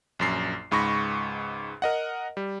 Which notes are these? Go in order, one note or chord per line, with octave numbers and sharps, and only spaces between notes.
A#1 F#2 C7
C#2 G#2 B5 C#6 A#6
A#4 D#5 F#5
G3